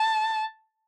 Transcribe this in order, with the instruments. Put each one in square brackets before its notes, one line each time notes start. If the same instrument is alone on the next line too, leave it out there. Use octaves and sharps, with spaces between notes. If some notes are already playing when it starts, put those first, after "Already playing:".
Already playing: [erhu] A5